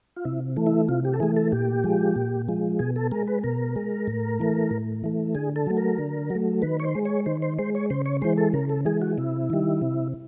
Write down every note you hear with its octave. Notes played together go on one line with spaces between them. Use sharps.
F4
C3 E4
E3 A3
E4
C3 F4
G4
A4
E3 A3 G#4
A4
A#2 G4
F3 G#3
A#2
F3 G#3
B2 G#4
A4
G#3 A#4
B4
B2 A#4
G#3
A2
E3 A3
A2
E3 A3
D3 G#4
A4
F#3 A3
A#4
D3
F#3
A3
D#3 B4
C#5
C5
G#3
C#5
D#3 C5
C5
G#3 C5
C#5
C#3 C5
C#5
E3 G#3 C5
A4
C#3 A#4
A4
E3 G#3 G#4
F#4
C3 E4
D#3 G3
C3